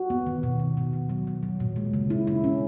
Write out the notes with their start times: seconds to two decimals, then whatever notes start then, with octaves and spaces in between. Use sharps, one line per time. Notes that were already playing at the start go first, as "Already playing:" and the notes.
Already playing: F#4
0.10 B3
0.27 D#3
0.43 B2
0.60 B2
0.77 B2
0.93 B2
1.09 F#3
1.27 F#3
1.43 F#3
1.60 A#2
1.76 G#3
1.94 C#3
2.10 E4
2.27 E4
2.44 C#4